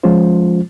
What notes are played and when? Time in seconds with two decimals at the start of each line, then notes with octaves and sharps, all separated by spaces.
0.03 F3 G#3 C#4 F4 C5